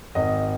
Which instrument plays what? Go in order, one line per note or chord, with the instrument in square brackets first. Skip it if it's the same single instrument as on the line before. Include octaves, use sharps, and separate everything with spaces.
[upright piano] G#1 D#5